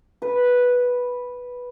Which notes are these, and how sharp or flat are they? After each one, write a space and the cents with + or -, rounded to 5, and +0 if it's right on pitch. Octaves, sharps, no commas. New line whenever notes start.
B4 -5